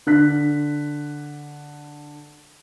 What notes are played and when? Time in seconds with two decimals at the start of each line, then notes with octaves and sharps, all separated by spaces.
0.07 D3 F#6 B6